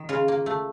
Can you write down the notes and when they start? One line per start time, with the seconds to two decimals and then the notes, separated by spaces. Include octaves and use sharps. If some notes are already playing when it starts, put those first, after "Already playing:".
Already playing: D#3
0.09 C#3 F4
0.28 A#3
0.46 A3